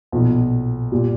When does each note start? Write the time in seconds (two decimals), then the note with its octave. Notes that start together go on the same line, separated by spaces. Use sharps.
0.12 B1 A#2 F3
0.92 A#2 G3